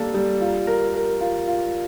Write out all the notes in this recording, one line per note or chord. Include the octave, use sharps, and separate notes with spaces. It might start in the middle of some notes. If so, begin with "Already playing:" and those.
Already playing: G3 A#3 D4 A4
G3
F4
A#4
A#4
F4
F4